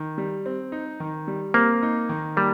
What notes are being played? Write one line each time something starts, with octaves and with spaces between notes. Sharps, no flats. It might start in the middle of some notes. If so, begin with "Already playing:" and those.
Already playing: D#3
G3
C4
D#4
D#3
G3
A#3 C4
D#4
D#3
G3 A#3